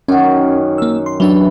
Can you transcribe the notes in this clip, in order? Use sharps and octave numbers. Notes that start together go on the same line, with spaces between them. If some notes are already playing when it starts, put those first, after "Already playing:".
F#2 D#3 C#4
A#3 E6
C6
E3 F#3 D4 E5